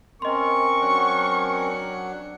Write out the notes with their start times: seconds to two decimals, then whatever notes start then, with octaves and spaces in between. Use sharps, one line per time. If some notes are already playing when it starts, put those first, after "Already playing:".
0.22 C4 C#4 A#4 D#5 C6 C#6
0.82 F#3 D4 F#5